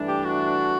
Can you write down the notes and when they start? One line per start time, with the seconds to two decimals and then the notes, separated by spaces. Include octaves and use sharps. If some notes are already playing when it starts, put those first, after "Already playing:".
Already playing: G2 E3 A3 D4
0.08 G4
0.24 F#4